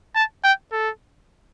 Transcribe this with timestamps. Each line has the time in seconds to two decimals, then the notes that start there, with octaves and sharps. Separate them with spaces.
0.15 A5
0.44 G5
0.72 A4